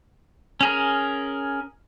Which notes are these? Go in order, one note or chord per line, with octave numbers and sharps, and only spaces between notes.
C#4 G#4 A#4